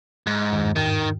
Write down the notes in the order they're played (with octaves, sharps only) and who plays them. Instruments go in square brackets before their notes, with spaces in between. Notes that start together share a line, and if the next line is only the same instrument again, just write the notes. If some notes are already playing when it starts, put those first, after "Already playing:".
[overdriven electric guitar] G#2
[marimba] E2 G2 D#3
[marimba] G#2 G5 [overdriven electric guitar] D#3